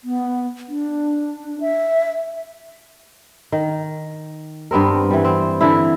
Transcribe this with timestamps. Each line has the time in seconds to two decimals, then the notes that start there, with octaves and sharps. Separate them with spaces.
0.04 B3
0.69 D4
1.61 E5
3.52 D#3
4.71 G2 B3 C4 A#4
5.11 E3 G3
5.25 C4
5.61 D3 E3 E4